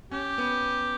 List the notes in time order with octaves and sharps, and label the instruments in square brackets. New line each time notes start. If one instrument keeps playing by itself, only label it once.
[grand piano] C#4 [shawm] G4
[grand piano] B3